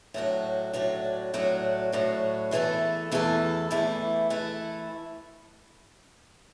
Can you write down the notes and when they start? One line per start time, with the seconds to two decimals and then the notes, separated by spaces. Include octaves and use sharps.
0.14 A2 F#3 D4 F#4
0.74 A2 F#3 D4 F#4
1.34 A2 F#3 D4 F#4
1.92 A2 F#3 D4 F#4
2.51 E2 E3 A3 E4 A4
3.12 E2 E3 A3 E4 A4
3.71 E2 E3 A3 E4 A4
4.30 E3 A3 E4 A4